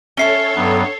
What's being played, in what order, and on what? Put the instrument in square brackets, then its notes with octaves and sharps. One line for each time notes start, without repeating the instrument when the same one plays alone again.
[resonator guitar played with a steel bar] C#4 E5 A5 [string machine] A4 C#5 [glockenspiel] C7 G7
[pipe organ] G2 F#3 B3